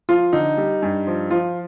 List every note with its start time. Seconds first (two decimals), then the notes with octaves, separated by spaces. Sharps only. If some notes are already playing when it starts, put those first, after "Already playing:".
0.09 F3 F4
0.33 D3 D#4
0.57 G3
0.82 G2
1.07 F3
1.31 F3 F4